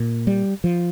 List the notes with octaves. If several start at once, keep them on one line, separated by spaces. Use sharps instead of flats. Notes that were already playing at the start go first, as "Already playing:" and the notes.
Already playing: A#2
G3
F3